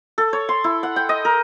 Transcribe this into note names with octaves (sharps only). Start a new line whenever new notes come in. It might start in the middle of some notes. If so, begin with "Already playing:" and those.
A4
C#5
C6
E4
F#5
G5
D#5
A#4